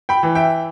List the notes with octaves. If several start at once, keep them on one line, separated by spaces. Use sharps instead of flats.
G5 B5
E3
E5 G5